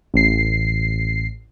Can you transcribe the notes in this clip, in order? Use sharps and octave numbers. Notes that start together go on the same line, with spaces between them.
A1 C7